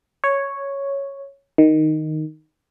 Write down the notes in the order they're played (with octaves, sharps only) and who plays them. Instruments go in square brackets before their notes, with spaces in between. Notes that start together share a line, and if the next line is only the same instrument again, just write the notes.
[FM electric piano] C#5
D#3